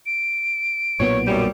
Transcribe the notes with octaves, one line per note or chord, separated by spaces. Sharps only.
D7
B1 A#2 B3 C#5
F#2 G3